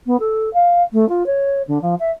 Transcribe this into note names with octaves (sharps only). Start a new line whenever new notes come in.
B3
A4
F5
A3
F4
C#5
D3
F3
E5